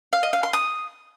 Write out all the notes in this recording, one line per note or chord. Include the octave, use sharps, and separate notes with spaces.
F5
D#5
F5
C6
D#6